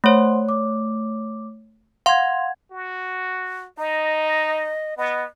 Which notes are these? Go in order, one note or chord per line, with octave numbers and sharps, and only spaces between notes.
A3 C5 C#5 F#5 C6
D6
F5 F#5 C6 G#6
F#4
D#4 D#5
B3 D#5